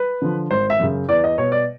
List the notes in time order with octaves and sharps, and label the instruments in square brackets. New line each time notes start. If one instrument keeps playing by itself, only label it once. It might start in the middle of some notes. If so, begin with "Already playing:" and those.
Already playing: [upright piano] B4
D3 F3
G#1 C5
E5
F#2 C#3
E2 D5
D#5
B2 C#5
D5